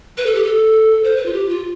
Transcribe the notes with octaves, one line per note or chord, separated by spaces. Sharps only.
B4
A4
G4
A4
C5
B4
F4
G4
F4